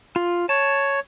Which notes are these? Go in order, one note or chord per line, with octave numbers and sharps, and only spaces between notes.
F4
C#5 A5